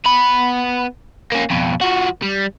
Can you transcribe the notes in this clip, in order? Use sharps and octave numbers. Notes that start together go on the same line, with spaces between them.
B3 B5
A#3 C#4
F2 B2
F3 F#4
G3